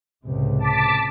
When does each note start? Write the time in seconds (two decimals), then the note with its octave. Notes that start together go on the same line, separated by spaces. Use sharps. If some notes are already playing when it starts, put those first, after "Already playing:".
0.24 C#2 A2 C3
0.59 A5 D6 B6